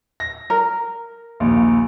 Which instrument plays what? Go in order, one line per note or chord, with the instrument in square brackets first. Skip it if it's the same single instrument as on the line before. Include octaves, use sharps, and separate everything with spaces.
[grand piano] A#6
[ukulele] A#4
[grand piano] A#1 D#2